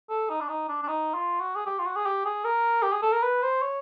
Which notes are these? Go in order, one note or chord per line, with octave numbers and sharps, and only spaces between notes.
A4
D#4
D4
D#4
D4
D4
D#4
F4
F#4
G#4
G4
F4
F#4
G#4
G4
G#4
A#4
G4
G#4
A4
A#4
B4
C5
C#5